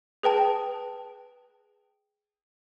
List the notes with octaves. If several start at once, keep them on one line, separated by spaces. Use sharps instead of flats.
G#4 B4 G5 A5